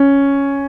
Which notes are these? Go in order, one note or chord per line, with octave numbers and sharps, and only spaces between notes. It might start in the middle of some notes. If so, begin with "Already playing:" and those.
Already playing: C#4